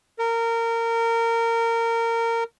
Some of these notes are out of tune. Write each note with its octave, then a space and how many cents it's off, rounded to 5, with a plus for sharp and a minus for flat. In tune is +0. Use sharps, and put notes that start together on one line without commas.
A#4 -20